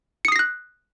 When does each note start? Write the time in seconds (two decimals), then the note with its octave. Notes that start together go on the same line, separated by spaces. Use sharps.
0.25 C#7
0.28 D#6
0.32 C7
0.36 A#6
0.39 F#6